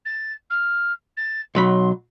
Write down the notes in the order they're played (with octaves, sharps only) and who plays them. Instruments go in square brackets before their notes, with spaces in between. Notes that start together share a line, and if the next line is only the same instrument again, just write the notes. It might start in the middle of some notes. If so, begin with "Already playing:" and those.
[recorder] A6
F6
A6
[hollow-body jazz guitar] B1 F#3 B5 [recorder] C6